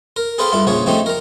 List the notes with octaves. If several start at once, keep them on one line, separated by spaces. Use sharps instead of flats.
A#4
G#4 A4 B4 C5 F5 G5
G2 E4 F4 A4
A#1 C#3 F3 G#4 C#5
C#3 F3 A3 C4 D#4 G4
A#4 A#5